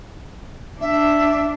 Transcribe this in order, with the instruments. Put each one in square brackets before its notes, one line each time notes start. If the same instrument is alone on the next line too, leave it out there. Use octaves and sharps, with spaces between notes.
[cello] D4 [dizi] E5